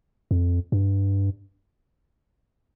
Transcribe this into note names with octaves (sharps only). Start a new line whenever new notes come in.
F2
G2